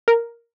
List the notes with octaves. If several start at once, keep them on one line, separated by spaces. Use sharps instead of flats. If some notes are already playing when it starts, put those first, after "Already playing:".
A#4